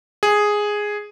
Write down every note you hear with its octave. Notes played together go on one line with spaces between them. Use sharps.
G#4